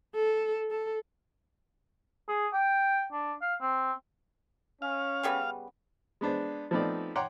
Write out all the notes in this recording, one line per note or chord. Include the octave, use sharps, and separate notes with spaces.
A4
A4
G#4
G5
D4
F5
C4
C#4 F5
C#3 G3 B3
G#3 B3 D4 C5
F3 A3 B3 C4 D#4 D5
C#5 F#5 G5 A#5 C6 D6